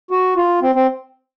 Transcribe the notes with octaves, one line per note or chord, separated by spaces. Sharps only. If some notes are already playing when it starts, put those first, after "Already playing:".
F#4
F4
C4
C4